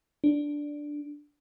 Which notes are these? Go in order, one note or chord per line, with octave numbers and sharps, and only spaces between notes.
D4